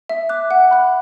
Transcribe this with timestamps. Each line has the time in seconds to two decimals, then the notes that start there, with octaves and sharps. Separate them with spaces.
0.09 E5
0.29 D6 F#6
0.51 F#5
0.71 B5 F#6